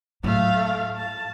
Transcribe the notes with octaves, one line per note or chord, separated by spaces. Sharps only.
A2 F#3 A3 F5
A5